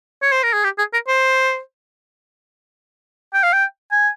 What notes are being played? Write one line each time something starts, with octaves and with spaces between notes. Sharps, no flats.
C#5
C5
A#4
G#4
G4
G#4
A#4
C5
G5
F5
G5
G#5